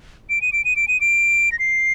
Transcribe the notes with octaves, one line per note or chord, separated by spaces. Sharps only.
D7
D#7
D7
D#7
D7
D#7
D7
A#6
C7